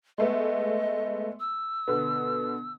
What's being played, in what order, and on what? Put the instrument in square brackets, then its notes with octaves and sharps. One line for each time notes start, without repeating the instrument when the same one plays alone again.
[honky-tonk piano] G#3 A3 B3 [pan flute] D#5
[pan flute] E6
[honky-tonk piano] B2 D3 B3